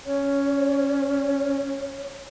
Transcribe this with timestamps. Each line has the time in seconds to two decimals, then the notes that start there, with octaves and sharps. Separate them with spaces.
0.06 C#4 C#5